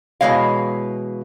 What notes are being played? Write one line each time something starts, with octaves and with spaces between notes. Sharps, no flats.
B2 E3 G#3 C#5 F5